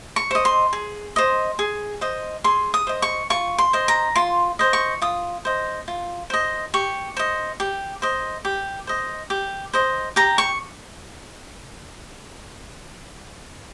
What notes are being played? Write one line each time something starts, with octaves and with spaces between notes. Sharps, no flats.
C#6
C5 D#5
C6
G#4
C5 D#5
G#4
C5 D#5
G#4 C6
D#6
C5 D#5
C#6
F4 C#6
C6
C5 D#5
A#5
F4 C6
C5 D#5
C#6
F4 D#6
C5 D#5
F4
C5 D#5
G4 C#6
C5 D#5
G4
C5 D#5
G4
C5 D#5
G4
C5 D#5
G4 A#5
C#6